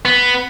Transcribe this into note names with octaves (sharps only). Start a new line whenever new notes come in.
B3